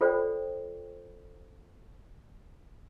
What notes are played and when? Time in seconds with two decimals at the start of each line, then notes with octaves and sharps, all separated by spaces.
0.01 F4 A4 C5 D5 G5